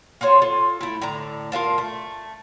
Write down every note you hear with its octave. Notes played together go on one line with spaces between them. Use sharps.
F4 F#4 C5 C#5
F4 A4
A3 E4
A2 D3 A#5
F4 A#4 F5 A5
A3